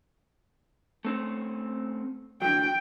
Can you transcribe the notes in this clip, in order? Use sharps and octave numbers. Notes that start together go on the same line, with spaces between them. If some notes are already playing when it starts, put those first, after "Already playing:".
A3 C4 C#4
D3 F#3 G5